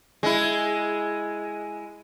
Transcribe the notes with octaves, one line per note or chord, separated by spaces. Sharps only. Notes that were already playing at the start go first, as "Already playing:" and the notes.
G#3 E4